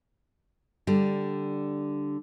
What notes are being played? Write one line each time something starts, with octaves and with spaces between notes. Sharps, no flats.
D3 G3